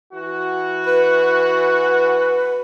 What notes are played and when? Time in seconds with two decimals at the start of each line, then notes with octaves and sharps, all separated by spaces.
0.13 E3 F#4
0.86 B4